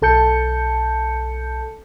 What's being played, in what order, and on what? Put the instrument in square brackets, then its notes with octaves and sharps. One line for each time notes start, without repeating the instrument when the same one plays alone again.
[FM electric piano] B1 A4 A5 G6 C#7